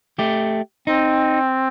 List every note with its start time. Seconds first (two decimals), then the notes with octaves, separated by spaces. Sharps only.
0.19 A3 G4
0.87 C4 D#4